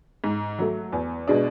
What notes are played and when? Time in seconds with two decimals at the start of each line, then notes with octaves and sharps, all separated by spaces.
0.24 G#2
0.59 F#3 A3
0.93 E2
1.28 B2 G#3 D4